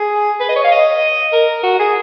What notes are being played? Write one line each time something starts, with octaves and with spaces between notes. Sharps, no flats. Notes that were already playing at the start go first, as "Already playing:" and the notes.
Already playing: G#4
B4
D#5
C#5
F5
D#5
A#4
F#4
G#4